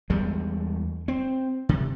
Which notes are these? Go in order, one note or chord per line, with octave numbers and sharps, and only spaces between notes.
E2 G3 G#3
C4
C3